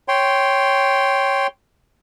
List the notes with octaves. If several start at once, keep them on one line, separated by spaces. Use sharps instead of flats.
C#5 G5 C6